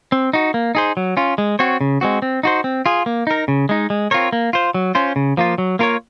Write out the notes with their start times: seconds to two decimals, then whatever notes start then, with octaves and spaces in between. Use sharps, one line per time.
0.12 C4
0.33 D#4 F#4
0.54 A#3
0.75 D#4 G#4 C5
0.97 F#3
1.17 C#4 F4
1.38 G#3
1.59 C4 F#4 C#5
1.81 C#3
2.01 G#3 C4 F#4
2.22 C4
2.43 D#4 F#4 C5
2.64 C4
2.86 F4 G#4
3.06 A#3
3.27 D#4 A#4
3.48 C#3
3.69 G#3 D#4
3.90 G#3
4.11 C4 F4 A#4 C#5
4.33 A#3
4.53 F4 C5
4.74 F#3
4.95 C#4 F4 C5
5.16 C#3
5.37 F3 A#3 F4
5.58 F#3
5.79 A#3 F4 A#4 C#5